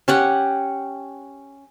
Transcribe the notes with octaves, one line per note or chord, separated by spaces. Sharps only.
C#4 G4 F#5